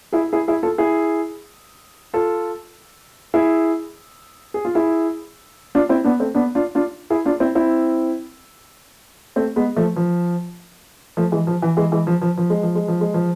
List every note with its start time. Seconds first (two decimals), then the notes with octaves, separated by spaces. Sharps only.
0.12 E4 G#4
0.33 E4 G#4
0.48 E4 G#4
0.63 F4 A4
0.78 E4 G#4
2.14 F4 A4
3.34 E4 G#4
4.54 G#4
4.65 F4
4.75 E4 G#4
5.75 D4 F4
5.89 C4 E4
6.04 B3 D4
6.20 A3 C4
6.35 B3 D4
6.55 D4 F4
6.75 D4 F4
7.10 E4 G#4
7.26 D4 F4
7.40 C4 E4
7.55 C4 E4
9.36 A3 C4
9.56 G#3 B3
9.76 F3 A3
9.96 F3
11.17 F3 A3
11.32 E3 G#3
11.47 F3
11.62 E3
11.77 E3 G#3
11.92 E3 G#3
12.07 F3
12.22 F3
12.38 F3
12.50 G#3
12.63 F3
12.75 G#3
12.88 F3
13.01 G#3
13.14 F3